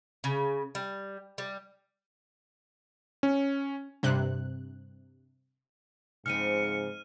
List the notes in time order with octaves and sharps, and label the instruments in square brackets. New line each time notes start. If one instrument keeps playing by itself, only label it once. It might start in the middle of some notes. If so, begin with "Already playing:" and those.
[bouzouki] C#3
G3
G3
[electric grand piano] C#4
[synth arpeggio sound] G2 C3 F#6
[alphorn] G#2 [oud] C#3 F3 C4 [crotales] F6 D#7 [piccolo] C#7